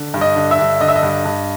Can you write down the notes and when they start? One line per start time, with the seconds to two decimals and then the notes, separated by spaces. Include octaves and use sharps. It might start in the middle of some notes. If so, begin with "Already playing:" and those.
Already playing: D3
0.14 G2
0.21 D#5
0.36 D3
0.51 E5
0.59 G2
0.81 D3 D#5
0.88 E5
0.96 D#5
1.03 G2
1.25 G2